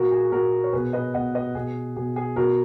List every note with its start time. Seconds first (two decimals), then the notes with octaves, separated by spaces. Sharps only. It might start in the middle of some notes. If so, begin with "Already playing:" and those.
Already playing: A#2 F#4 A#4
0.12 G#4
0.31 A#2 F#4 A#4
0.64 C#5
0.73 B2 G#4 B4
0.93 B4 D#5
1.14 B2 D#5 F#5
1.35 B4 D#5
1.55 B2 G#4
1.96 B2 G#4
2.16 G#4
2.36 B2 F#4 A#4